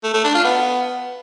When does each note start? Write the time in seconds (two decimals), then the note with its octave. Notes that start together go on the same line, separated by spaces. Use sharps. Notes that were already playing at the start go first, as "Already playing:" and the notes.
0.04 A3
0.14 A3
0.24 D4
0.34 F4
0.45 B3